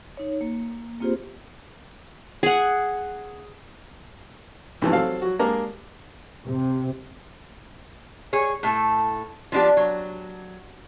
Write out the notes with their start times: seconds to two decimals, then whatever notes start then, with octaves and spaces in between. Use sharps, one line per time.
0.17 D#4 C#5
0.41 A#3
1.00 A#3 C4 F4 G4 G#4 C5
2.43 G#4 F#5
4.82 B1 G#2 C3 E3 F3 A3
4.93 F#3 C4 A4 F5
5.22 F#3 F#4
5.39 G#3 A#3 D4 G4 A#4
6.47 C3
8.33 G#4 C#5
8.63 A2 A3 A4
9.52 F3 B3 D4 G4
9.77 F#3